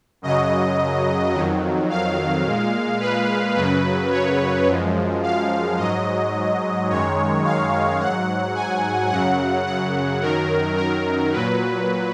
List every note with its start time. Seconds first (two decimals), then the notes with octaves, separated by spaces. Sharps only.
0.22 F#2 C#3 F#3 D#5
1.33 F2 D#3 F#3
1.90 F5
2.45 A#2 G#3
3.00 B4
3.56 F#2 C#3 F#3 B4
4.11 C#5
4.67 F#2 F3 G#3
5.23 F5
5.77 G#2 F#3 D#5
6.89 F#2 D#3 G#3 C#5
7.44 F5
8.00 G#2 F#3 F#5
8.55 G#5
9.10 F#2 C#3 F#3 F#5
9.67 F#5
10.22 F#2 D#3 F#3 A#4
10.78 A#4
11.33 A#2 F#3 B4